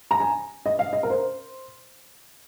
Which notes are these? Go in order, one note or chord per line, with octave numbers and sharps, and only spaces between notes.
A#5
G#5
D#5
F5
D#5
A#4
C5